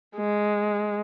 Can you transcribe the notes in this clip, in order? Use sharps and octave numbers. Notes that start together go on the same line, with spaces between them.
G#3